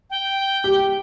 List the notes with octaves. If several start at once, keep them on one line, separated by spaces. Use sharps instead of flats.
G5
G4